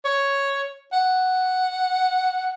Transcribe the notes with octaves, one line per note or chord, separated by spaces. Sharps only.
C#5
F#5